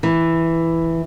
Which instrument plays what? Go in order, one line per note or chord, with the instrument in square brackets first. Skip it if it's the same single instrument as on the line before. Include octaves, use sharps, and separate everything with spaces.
[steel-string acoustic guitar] E3